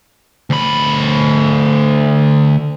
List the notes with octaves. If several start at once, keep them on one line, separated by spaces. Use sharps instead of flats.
D2 B5